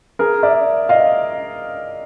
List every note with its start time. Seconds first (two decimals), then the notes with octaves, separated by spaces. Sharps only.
0.19 G#4 A#4
0.43 D5 E5
0.89 D#5 F5